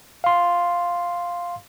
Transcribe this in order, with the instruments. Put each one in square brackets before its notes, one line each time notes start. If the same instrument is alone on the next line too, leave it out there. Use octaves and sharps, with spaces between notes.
[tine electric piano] F5 C6